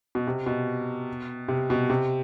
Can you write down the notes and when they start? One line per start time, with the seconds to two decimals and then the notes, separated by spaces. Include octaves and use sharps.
0.15 B2
0.27 C3
0.46 B2
1.48 C3
1.70 B2
1.90 C3